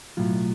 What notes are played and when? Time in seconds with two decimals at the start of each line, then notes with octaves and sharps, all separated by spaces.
0.17 B1 A2 F#3 F4